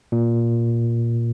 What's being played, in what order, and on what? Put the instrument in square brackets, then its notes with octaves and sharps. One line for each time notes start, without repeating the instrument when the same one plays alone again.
[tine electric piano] A#2